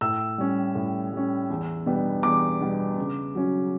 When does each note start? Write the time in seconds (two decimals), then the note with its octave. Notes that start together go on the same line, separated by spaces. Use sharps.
0.01 A2 E6
0.38 G3 C#4
0.75 A2
1.12 G3 C#4
1.50 E2
1.86 B2 G3 B3 D4
2.23 E2 D6
2.60 B2 G3 B3 D4
2.98 C#3
3.35 F#3 C#4